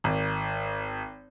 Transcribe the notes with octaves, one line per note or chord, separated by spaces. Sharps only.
G#1